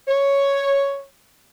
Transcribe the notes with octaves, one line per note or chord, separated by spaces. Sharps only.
C#5